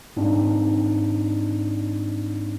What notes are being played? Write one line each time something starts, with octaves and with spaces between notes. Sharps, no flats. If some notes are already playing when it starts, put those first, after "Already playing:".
G#2 C4 D4 D#4